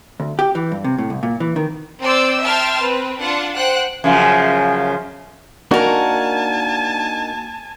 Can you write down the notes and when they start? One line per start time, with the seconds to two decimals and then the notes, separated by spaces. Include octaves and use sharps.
0.20 D2
0.39 G4
0.55 E3
0.72 G2
0.84 C3
0.98 A2
1.10 C2
1.23 A#2
1.40 E3
1.56 D#3
2.02 C4 D5 C6 E6 G6
2.43 E5 G5 A5 C6 F6
2.82 C4 B4
3.21 D4 F4 F#5
3.56 C5 F#5 G5 F#6
4.04 F#2 C#3 F3
5.71 A#3 D4 D#4 F#4 A#4 G#5 A5